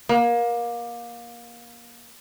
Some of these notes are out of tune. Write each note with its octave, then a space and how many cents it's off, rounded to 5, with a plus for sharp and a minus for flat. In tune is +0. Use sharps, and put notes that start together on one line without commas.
A#3 +25